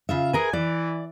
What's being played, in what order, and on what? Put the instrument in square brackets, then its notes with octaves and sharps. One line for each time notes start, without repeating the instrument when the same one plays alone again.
[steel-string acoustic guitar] C#3 F4 E5
[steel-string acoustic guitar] G#4 A#4 B4 [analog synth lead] G#5
[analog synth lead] E3 [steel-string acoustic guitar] D5